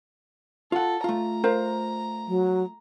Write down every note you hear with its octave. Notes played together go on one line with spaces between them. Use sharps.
F4 A4 F#5
A3 F4 A#5
A#4 C5 F5
F#3